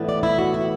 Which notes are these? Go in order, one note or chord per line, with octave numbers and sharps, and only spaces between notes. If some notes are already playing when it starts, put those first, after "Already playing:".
Already playing: A2 E3 B3 D4
D5
E4
F#4
E4